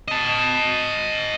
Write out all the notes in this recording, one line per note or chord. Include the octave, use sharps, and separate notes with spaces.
D#5 A5